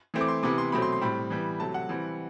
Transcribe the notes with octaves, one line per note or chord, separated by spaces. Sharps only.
E3 A3 C4
D6
C6
C3 E3 B3 D6
C6
B2 F#3 A3 C4 B5
C6
C6
A2 G3 C4 B5
E3 G3 B3
C3 F#3 A3 A5
F#5
E3 G3 C4